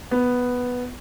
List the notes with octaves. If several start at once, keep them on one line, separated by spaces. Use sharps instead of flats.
B3